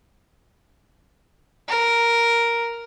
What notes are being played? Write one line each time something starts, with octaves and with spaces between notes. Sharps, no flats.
A#4